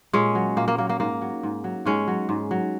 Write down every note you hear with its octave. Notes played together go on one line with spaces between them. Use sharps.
A#2 G#3 C#4
F#3
A#2 A#3
A#3
F#3 A#3
A#3
G#2 A#3
F#3
G#2
F#3
G#2 G#3 C#4
F#3
G#2
F#3